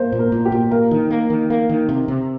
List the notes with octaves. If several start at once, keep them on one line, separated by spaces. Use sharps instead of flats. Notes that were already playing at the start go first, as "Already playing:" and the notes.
Already playing: A#3 C5
A#2
A#4
A#2
G4
A#2
A#3 A#4
D#3
A#3
D#3
A#3
D#3
C3
C3